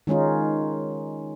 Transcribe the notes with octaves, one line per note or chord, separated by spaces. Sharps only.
D#3 G#3 C#4 D#4 F4